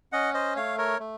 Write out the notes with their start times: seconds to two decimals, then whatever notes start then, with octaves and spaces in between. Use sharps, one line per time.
0.12 C#4 D#5 F#5
0.34 C5 D#5
0.56 A3 C#5 F5
0.78 A#4 C#5
1.00 A3